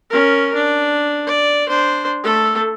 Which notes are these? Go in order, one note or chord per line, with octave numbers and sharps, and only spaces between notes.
C#4 A#4
D4
D5
D4 C5
A3 A4